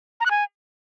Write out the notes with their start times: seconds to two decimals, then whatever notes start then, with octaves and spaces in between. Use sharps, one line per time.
0.20 A#5
0.26 F#6
0.31 G#5